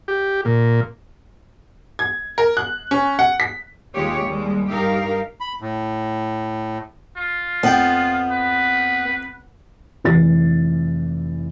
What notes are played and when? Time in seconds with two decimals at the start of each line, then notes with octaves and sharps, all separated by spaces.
0.08 G4
0.45 A#2
1.99 G#6
2.38 A#4
2.57 F#6
2.91 C#4
3.19 F#5
3.40 B6
3.94 D#2 G#3 F4 G4 C#5
4.25 D#2 G3 G#3
4.70 G2 D#4 G4 A#4 F5
5.40 B5
5.61 A2
7.17 F4
7.63 F2 B3 G5
8.31 B4
10.04 F1 E3 A6